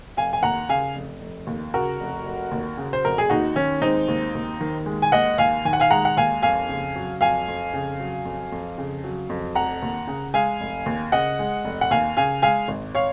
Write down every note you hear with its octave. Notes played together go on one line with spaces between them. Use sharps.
F1 F5 G#5
G#5
D#2 F#5 A#5
C#3 F5 G#5
F1
F1
D#2
C#3 F#4 A#4
F1
F1
D#2
C#3
C5
F1 A#4
G#4
D#2 D#4 F#4
D#3 C#4
G#3 C4 D#4
D#2
D#2
D#3
G#3
G#5
D#2 D#5 F#5
D#2 F5 G#5
D#3 G#5
F#5
F5 G#5
G#3 F#5 A#5
F#5
D#2 F5 G#5
F2 F5 G#5
C#3
F#3
F2 F5 G#5
F2
C#3
F#3
F2
F2
C#3
F#3
F2
F1 F#5 A#5
D#2
C#3
G#3 F5 G#5
F1
D#2
C#3 D#5 F#5
G#3
F1
F#5
D#2 F5 G#5
C#3 F5 G#5
G#3 F5 G#5
G#1
C#5 F5